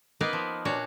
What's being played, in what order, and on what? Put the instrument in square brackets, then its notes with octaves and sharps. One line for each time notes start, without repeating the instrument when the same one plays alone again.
[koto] A#3 B3 D#4 A#4 B4 F5
F3
A#2 D4 F#4 C#5